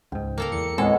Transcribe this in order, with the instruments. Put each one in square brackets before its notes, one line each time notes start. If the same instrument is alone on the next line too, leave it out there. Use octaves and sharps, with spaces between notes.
[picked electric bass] C#2 G#2 [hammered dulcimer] G5
[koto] A#3 A4 A#4
[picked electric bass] E2 [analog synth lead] C#7
[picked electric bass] D#2 A2 C4 [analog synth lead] G#3 [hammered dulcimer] B3 C#5 F#5 [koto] A4